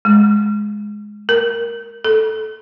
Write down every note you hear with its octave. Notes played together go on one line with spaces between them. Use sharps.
G#3
A#4
A4